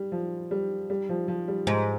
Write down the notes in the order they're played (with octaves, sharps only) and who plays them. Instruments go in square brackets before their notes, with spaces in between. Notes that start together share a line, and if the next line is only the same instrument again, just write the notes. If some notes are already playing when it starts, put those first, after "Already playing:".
Already playing: [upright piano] G3
F3
G3
G3
F3
F3
G3
[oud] G#2